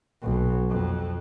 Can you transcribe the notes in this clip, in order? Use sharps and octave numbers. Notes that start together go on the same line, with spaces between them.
B1
F2